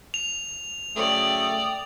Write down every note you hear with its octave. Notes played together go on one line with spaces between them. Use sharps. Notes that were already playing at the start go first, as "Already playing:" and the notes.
F7
C#3 F#3 A3 D5 G5 D#6